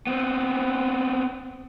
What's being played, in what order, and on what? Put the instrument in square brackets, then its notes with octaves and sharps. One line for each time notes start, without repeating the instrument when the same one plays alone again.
[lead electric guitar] B3 C4